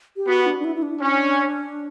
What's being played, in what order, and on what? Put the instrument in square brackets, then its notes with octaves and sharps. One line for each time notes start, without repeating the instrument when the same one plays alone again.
[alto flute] G4
[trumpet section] B3 [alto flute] F#4
[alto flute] D4
D4
E4
E4
D4
[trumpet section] C#4